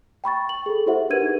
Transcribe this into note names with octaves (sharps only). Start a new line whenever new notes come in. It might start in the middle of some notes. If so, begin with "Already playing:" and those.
G5 B5 C#6 A6
F#7
G#4 A4
E4 F#4 G4 C5 E5 F#5
D4 A#4 B4 G#6 D#7
D#4 G#4